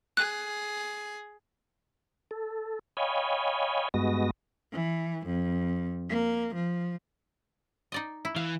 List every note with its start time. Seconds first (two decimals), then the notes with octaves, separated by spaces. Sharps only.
0.17 G#4 F#6
2.31 A4
2.97 C#5 D#5 F5 G5 G#5 B5
3.94 G2 G#3 B3 F#4 D#5 A#6
4.73 E3
5.27 F2
6.10 A#3
6.55 F3
7.92 D#4 D5 D#5
8.25 E4
8.36 E3 F5